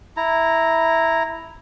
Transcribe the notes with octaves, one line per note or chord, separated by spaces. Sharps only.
E4 A#5